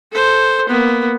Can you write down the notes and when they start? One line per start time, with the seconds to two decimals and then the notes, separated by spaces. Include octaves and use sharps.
0.12 A4 C5
0.69 A#3 B3